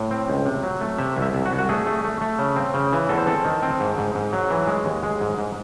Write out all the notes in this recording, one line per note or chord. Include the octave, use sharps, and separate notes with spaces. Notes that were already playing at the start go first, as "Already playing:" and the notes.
Already playing: A2
C4
C#2
C3
F#3
A3
C3 E5
C2
E5
C2
F#4
C2
F#4
A3 G#4
A3
A3
A3
C#3
C4
C#3
E3
E2 A4
C5
C4 A4
D#3
C4
G#2
G#2
G#2
F#3
E3
G#3
D#2
G#3
G#2
G#2